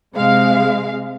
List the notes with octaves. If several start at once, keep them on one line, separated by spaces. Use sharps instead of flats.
C3 G#3 F5